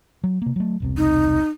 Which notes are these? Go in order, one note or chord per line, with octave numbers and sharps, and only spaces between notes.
F#3
C3 A#3
F#3 A3
E1 C2 C3
D#4